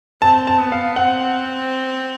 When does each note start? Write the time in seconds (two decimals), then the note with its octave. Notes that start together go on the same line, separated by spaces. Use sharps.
0.22 C4 A5
0.47 A5
0.59 B3
0.72 F5
0.96 C4 F#5